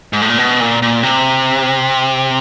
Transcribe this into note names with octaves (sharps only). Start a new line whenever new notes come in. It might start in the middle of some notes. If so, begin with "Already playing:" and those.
G#2
A2
A#2
B2
A#2
A#2
C3